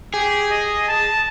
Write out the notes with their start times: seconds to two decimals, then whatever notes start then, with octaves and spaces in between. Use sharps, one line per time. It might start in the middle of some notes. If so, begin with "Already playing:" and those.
0.14 G4 G#4
0.51 D#5
0.88 A5